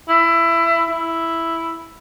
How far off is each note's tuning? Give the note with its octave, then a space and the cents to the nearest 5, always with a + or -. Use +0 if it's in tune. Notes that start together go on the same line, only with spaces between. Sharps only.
E4 +20
E4 +0